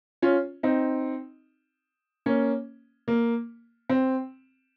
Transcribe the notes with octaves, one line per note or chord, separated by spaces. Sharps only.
C#4 F4
C4 D#4
A#3 C#4
A#3
C4